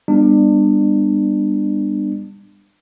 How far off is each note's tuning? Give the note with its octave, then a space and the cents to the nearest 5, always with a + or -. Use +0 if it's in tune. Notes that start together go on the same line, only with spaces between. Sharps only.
G3 +35 B3 +0 D4 +30